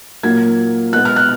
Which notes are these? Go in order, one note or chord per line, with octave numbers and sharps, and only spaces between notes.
A#2 F#3 A#3 G#6
B2 G#3 B3 F#6
F6
F#6